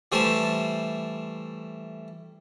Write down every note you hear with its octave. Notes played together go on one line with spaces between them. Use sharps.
E3 G3 A3 C5 A5